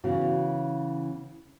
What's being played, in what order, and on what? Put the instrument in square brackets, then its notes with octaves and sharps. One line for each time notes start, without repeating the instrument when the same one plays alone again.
[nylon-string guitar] C#3 E3 B3 F#4